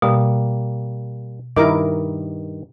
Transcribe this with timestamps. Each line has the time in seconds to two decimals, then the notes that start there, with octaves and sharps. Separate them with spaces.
0.02 B2 G3 A#3
1.56 G2 D#3 E4 A#4 D#5 D6